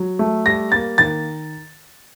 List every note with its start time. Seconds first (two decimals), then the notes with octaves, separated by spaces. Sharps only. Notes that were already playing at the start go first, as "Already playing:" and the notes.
Already playing: F#3
0.19 A3
0.46 G3 A#6
0.72 A#3 A6
0.98 D#3 A6